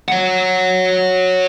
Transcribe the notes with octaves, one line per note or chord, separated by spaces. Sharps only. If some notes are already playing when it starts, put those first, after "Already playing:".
C#5 F#5